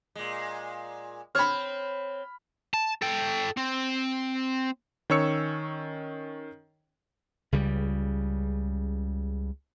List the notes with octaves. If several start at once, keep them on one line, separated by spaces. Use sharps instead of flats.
A#2 G#3
C4 C#5 B5 F6
A5
A4 G5
C4
D#3 C#4 C#5 E6 C#7
C#2 C#3 G3